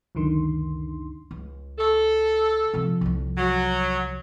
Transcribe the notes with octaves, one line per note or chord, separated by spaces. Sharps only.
C#2 F#2 D3 D#3 C6
C#2
A4
C3 F3
C2 F2
F#3